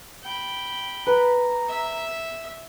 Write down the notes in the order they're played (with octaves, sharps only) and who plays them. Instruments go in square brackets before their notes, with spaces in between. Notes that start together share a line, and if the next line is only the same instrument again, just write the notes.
[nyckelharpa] G5 B5
[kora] B4 [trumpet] A#5
[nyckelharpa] E5